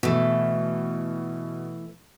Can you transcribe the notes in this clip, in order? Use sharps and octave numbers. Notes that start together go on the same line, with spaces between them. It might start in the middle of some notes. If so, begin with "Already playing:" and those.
B2 E3 A3